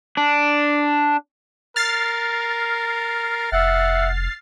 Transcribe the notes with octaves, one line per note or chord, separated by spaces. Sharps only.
D4
A#4 F6 A6 C7
F1 E5 F#5